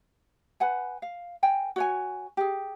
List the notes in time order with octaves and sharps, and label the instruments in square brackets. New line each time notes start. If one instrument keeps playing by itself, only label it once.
[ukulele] B4 F#5 G#5
F5
A#4 G5 G#5
F#4 C#5 G#5
G4 G#4